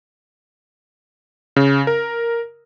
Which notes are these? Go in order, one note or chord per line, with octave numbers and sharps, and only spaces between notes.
C#3
A#4